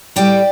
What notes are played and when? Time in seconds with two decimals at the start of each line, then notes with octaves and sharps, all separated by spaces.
0.16 A2 G3 D5 G5